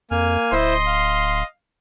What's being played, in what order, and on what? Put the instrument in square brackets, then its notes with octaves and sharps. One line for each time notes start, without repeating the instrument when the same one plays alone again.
[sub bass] F2 [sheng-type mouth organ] A#3 G#5 F6
[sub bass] D1 [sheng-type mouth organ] E4 C5 [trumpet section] D#5 C6
[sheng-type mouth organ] F5